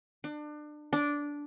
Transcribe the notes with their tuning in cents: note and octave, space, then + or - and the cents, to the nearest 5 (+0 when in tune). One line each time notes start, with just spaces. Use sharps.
D4 +30
D4 -10